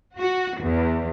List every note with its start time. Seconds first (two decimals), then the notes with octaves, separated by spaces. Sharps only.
0.16 F#4
0.61 E2